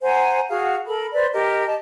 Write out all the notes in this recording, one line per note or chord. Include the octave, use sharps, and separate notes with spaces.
C5 F#5 G#5 A#5
F#4 G#4 F5 F#5
A4 A#4 B5
B4 C5 D5
G4 A#4 D#5
D#5 A5